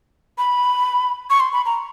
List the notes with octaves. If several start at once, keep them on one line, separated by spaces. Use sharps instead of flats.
B5
C#6
C6
B5
A#5